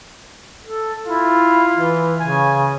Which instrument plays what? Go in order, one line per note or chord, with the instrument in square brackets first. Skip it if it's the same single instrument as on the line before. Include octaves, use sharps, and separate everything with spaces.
[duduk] A4
[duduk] E4 [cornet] F4
[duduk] E3
[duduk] C#3 [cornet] G#5